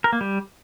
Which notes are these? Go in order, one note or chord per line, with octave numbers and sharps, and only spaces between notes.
A#4
A#3
G3